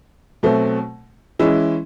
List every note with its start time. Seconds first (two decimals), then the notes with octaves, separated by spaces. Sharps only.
0.43 B2 F#3 A3 C4
1.39 E3 G#3 C#4 E4